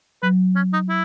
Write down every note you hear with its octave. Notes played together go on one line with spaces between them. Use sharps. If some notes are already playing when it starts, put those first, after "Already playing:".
F#3 B4
C#4
D#4
E4